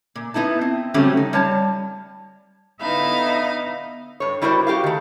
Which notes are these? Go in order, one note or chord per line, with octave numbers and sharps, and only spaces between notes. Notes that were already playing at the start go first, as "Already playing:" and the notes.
A#2
B3 D#4 E4 A5
C4
C#3 F#3 G3 A3 C4 C#4
D#4
G3 C#5 A5
D3 B3 D#4 E4 E5 F5
G2 C#5
G3 E4 F#4 A#4 C5 D5
F#4 G4 C5 F5
D#3 A3